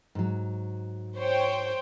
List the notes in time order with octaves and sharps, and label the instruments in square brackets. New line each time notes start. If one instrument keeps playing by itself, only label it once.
[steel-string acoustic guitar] G#2 F#3
[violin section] C5 C#5 G5